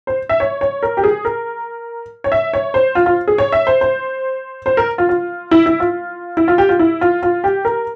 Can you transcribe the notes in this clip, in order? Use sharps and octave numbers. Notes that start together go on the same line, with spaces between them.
C5
E5
C#5
C#5
A#4
G4
G#4
A#4
C#5
E5
C#5
C5
F4
F4
G#4
C#5
E5
C5
C5
C5
A#4
F4
F4
E4
E4
F4
E4
F4
G4
F4
E4
F4
F4
G4
A#4